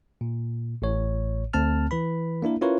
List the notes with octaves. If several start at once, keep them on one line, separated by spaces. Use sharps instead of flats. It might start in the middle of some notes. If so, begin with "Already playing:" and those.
A#2
A1 A2 C#5
D2 A3 C4 A5 F6
E3 B4 B5
A#3 D4 E4 A#4
C#4 E4 F4 A#4 B4 C#5